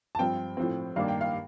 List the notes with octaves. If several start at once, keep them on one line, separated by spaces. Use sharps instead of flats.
A5
G2 F3 C4 G5
A2 F3 C4
G2 D#3 A#3 D4 F5
G5
F5